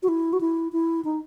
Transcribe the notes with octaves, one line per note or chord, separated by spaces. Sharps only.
F#4
E4
F#4
E4
E4
D#4